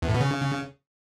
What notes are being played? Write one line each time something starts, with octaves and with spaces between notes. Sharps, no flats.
E2
A2
B2
C#3